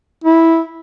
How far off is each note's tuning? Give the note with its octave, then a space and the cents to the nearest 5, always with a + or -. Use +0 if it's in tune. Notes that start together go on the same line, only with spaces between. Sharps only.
E4 -10